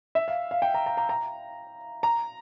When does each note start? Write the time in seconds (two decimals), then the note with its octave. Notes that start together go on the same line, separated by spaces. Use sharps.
0.15 E5
0.28 F5
0.51 F5
0.62 G5
0.74 A#5
0.86 A#5
0.97 A#5
1.09 A#5
2.03 A#5